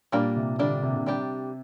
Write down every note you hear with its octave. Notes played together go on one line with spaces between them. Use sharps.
A#2 G3 A#3 D4
C3
D3 G3 A#3 D4
C3
D3
C3
G3 D4 G4